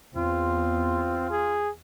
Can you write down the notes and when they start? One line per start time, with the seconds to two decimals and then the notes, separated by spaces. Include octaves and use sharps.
0.15 E2 C4 F4
1.31 G#4